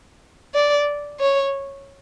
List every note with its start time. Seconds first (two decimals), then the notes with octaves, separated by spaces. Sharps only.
0.55 D5
1.20 C#5